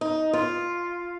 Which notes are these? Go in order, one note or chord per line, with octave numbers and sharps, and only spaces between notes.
D#4
F4